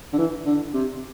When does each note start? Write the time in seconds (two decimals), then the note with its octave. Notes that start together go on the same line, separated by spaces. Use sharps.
0.13 D3
0.18 E3
0.46 D3
0.74 C3